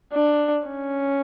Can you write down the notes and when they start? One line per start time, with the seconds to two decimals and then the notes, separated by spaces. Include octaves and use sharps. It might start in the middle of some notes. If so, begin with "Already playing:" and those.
0.14 D4
0.67 C#4